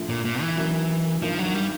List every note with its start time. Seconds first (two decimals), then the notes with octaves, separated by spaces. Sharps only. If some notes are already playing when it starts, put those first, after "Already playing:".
Already playing: A#1 A2 F3
0.09 A#2
0.25 A#2
0.41 E3
0.57 F#1 F#2 D#3 F#3
1.22 G#1 G2 D#3 F3
1.39 F#3
1.54 G3